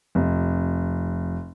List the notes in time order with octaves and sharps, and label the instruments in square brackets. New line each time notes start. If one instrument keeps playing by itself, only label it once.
[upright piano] F1